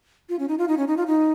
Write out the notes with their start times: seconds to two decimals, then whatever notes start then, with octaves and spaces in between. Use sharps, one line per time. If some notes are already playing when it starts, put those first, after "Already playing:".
0.29 F4
0.39 C#4
0.48 D#4
0.58 F4
0.68 D#4
0.77 C#4
0.88 D#4
0.97 F4
1.07 D#4